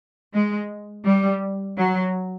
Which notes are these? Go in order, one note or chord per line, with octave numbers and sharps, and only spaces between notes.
G#3
G3
F#3